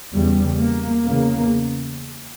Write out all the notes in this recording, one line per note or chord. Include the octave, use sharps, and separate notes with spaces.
E2 C#3 G3
A#3
E2 C#3 A#3